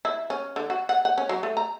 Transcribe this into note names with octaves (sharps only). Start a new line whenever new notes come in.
E4
C#4
D3
F#4
F#5
F#5
C#4
F#3
A3
A#5